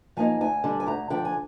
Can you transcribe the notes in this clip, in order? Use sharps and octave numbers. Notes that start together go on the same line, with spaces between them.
F3 A#3 D#4 G#5
D2 G#5
D3 G3
G#5
D2 A#5
D3 F3 G5
G#5